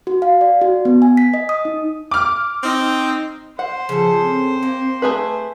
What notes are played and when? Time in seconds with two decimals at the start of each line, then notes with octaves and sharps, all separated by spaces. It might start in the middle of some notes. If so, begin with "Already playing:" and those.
0.07 F#4
0.22 F5
0.41 D5
0.61 F#4
0.85 B3
1.02 G#5
1.17 B6
1.34 D#5
1.49 D#6
1.65 D#4
2.11 D6 F6
2.64 C4 D#4
3.59 C5 F#5
3.89 C#3 F3 A4
4.22 C4
4.63 A#3
5.02 A3 G#4 B4